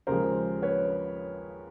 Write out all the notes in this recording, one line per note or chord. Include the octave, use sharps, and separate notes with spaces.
D#2 C#3 F3 G#3 A#4 C5
B4 C#5